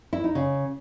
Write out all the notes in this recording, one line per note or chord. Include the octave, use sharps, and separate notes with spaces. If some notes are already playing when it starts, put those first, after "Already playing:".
E4
D#4
C#3